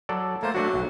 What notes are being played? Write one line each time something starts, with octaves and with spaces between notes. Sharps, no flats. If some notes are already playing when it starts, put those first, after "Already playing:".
F#3 A4 D5
A3 A#3 C5
F#3 A3 D4 F#4
B1